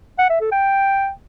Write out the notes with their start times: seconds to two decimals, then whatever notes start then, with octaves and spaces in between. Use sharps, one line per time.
0.19 F#5
0.30 E5
0.41 A4
0.52 G5